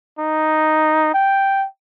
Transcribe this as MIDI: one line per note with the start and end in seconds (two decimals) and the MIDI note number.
0.19 1.14 63
1.14 1.66 79